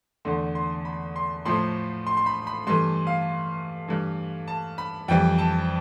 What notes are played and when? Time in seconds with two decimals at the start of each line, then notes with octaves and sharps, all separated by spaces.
0.25 E2 D3 A3 C6
0.55 C6
0.85 B5
1.16 C6
1.45 A2 F3 A3 C6
2.06 C6
2.17 C6
2.26 B5
2.47 B5
2.67 G2 E3 A3 C6
3.07 F5
3.87 G2 E3 A3
4.48 A5
4.78 B5
5.08 F2 E3 G3 G5
5.38 A5